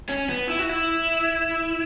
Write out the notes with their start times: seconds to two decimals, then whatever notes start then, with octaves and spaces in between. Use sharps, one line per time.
0.09 C#4
0.29 B3
0.49 E4
0.59 F#4
0.69 E4